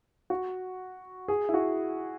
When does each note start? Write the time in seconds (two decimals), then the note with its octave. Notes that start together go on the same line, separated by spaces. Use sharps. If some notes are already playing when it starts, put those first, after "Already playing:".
0.30 F#4
1.28 G#4
1.49 E4
1.54 F#4